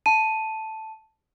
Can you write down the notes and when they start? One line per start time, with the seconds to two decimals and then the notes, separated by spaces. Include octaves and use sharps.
0.06 A5 D#7